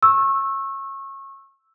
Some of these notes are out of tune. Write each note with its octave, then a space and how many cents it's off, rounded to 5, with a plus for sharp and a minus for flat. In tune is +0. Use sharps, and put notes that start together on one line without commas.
C#6 -25 E6 +0